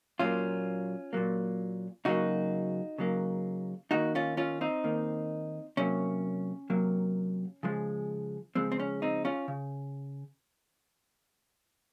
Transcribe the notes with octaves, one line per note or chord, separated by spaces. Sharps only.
A#2 F#3 A#3 C#4 F4
A#2 F#3 A#3
C#3 F#3 A#3 D#4 F#4
C#3 F#3 A#3
D#3 A#3 D#4 F#4
C#4 F4
C#4 F4
C4 D#4
D#3 A#3
C3 F#3 A#3 C#4
C3 F#3 A#3
C#3 F3 G#3
C#3 F3 G#3 C4
C4
C#4
C4 D#4
C#4 F4
C#3